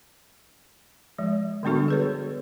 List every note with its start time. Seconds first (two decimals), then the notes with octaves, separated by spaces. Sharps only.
1.19 F3 G#3
1.63 D3 G3 B3 D4 F#4 A4
1.88 G#4 B4 C#5